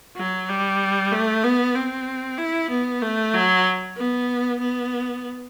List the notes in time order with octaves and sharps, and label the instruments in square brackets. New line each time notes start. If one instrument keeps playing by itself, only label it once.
[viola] F#3
G3
A3
B3
C4
E4
B3
A3
F#3
B3
B3